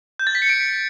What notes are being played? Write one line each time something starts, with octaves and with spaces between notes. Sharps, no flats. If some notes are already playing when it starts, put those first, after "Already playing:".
G6
A6
B6
C#7
G6 D7